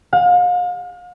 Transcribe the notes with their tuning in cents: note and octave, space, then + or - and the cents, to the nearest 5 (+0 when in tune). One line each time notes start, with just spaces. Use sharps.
F5 +40